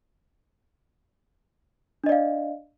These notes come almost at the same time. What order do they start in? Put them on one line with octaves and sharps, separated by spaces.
D4 D#5 D5 F5